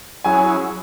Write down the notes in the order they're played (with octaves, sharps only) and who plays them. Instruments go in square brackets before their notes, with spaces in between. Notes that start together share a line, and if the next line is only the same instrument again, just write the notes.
[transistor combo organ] F#3 C#4 E4 G#4 [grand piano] G#5